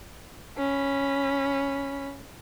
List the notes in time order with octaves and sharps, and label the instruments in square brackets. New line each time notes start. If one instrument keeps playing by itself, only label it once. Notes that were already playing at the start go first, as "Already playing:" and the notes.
[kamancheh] C#4 B5